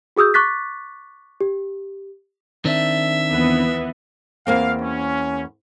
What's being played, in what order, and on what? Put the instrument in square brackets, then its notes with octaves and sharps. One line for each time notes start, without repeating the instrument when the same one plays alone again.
[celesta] F#4 G#4 D#6 E6 G6
C#6 D6 F#6 A6 B6
G4
[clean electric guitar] D#3 C4 D4 [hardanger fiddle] E5
[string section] D#2 E3 B3
[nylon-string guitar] E2 A#3 C4 [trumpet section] F5
[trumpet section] C#4